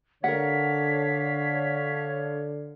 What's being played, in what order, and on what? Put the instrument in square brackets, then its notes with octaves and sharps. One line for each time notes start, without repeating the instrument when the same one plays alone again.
[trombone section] D3 [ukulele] A#4 F#5 [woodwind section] C#5 F5 [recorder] B6